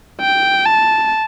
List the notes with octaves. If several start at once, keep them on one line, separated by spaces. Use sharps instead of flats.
G5
A5